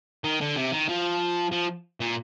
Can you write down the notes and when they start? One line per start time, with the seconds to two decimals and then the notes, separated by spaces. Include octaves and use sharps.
0.24 D#3
0.41 D3
0.56 C3
0.72 D#3
0.89 F3
1.52 F3
2.00 A#2